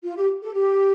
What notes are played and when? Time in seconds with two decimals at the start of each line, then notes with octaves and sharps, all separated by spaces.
0.04 F4
0.17 G4
0.42 A4
0.54 G4